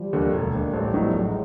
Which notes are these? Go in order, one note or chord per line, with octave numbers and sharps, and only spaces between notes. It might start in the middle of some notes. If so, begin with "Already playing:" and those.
Already playing: F3 G3
D#2 D3
E1
D#2 D3
A1 F3 G3
A2 F#3 B3 D#4
A1 F#3 G#3